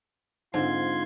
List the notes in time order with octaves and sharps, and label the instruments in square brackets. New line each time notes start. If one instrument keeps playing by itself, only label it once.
[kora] G#2 [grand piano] D3 C4 [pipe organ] F4 C6 G#6